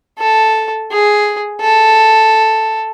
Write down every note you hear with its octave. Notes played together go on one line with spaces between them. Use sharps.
A4
G#4
A4